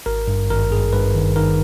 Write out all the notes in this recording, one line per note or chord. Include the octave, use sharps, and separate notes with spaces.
G#1 A#4
G2
G#1 A#4
G2 G#4
G2 B4
D#3
D#3 A#4